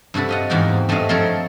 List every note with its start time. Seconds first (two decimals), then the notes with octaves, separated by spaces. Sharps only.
0.14 G2 C3 F#4 A4 B5
0.29 F4 D#5 F#5
0.50 E2 G#2 F#4 G4 G5
0.89 G2 A3 C4 F#4 D#5 F5
1.09 F3 C4 A4 A#4 C#5